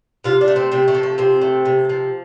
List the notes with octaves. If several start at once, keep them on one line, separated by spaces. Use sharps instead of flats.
C3 F4
D4
A3
C4
C3 C4
A3
F3
A3
C3 C4
A3
C3
F3